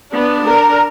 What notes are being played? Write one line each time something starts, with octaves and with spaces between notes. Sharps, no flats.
B3 D4
A#4